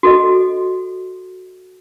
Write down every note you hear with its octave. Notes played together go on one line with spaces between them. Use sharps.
F#4 A4 D#5